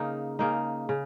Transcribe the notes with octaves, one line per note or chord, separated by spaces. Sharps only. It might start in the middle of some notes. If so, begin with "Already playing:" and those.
Already playing: C#3 A#3 D#4
C#3 A#3 D#4
C#3